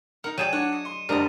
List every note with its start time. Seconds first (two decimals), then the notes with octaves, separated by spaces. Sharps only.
0.24 D#4 A#4 F#5
0.38 F#3 G#4 D5 G5 D#7 E7
0.53 D4 C#5 F#5
0.73 D#5 C#7
0.85 C6
1.09 F#1 D3 G3 D4 A#4 D#5 A5 F6